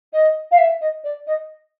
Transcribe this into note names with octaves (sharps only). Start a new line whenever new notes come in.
D#5
F5
E5
D#5
D5
D#5